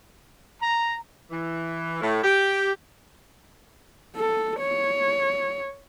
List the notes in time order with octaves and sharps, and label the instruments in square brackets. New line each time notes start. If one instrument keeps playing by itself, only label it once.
[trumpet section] A#5
[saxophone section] E3
A2
G4
[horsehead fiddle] A4
C#5